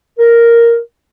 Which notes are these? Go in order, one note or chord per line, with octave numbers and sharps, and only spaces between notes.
A#4